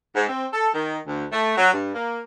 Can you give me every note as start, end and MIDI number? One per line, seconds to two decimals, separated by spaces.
0.16 0.25 44
0.28 0.46 60
0.53 0.69 69
0.73 0.97 51
1.07 1.25 38
1.32 1.53 57
1.57 1.72 54
1.73 1.93 43
1.95 2.20 58